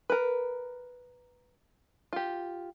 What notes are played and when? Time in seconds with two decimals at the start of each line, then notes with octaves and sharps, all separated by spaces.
0.10 A#4 B4
2.13 F4 G4